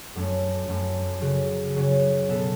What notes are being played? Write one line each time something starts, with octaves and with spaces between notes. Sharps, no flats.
F#2 F#3 A3 C#4
F#2 F#3 A3 C#4
C#3 F#3 C#4 F#4
C#3 F#3 C#4 F#4
B2 B3 A4